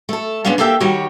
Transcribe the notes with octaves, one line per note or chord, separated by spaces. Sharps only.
A3 A4
G#3 B3 C#4 D4 C#5 F5
A#3 G4 A4 E5 G5
D#3 G3 F#4 G4 C#5